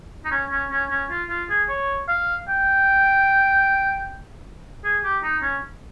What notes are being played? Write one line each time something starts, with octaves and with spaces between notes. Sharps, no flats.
D#4
C#4
C#4
C#4
C#4
F4
F4
G#4
C#5
F5
G5
G#4
G4
D#4
C#4